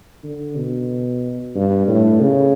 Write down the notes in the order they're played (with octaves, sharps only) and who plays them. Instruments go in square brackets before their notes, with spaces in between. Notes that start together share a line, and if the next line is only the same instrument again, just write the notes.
[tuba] D3
B2
G2
A2
C#3